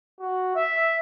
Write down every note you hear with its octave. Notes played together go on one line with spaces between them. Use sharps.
F#4
E5